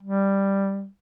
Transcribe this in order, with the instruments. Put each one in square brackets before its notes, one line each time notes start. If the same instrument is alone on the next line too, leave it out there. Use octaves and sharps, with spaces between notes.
[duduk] G3